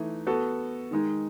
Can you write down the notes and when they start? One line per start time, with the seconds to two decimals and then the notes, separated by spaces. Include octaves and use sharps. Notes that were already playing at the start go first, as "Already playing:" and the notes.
Already playing: E3 A3 D#4
0.27 B3 F#4 A4
0.91 D#3 G#3 D#4